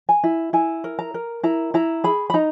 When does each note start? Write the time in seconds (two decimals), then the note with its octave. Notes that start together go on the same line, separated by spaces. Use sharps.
0.09 G#5
0.24 E4
0.53 E4 G#5
0.84 A#4
0.99 A#5
1.14 A#4
1.43 E4 A#5
1.74 E4 A#5
2.04 G#4 B5
2.30 B5
2.34 D#4 A#5